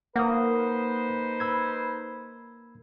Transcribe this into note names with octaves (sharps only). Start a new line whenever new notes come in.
A#3 D#4 B4 C5 F#5 D#6
B5 E6 G#6